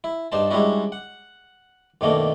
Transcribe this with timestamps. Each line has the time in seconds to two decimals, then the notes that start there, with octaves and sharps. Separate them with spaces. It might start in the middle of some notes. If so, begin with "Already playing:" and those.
0.04 E4
0.32 G2 D4 D#4 C5 A5
0.51 G3 G#3 C#4 D4 E4 F#4
0.92 F#5
2.01 F#2 B2 D#3 A3 A#3 D4